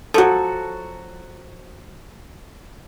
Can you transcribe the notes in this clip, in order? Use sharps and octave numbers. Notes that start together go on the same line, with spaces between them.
F3 F#3 F#4 A4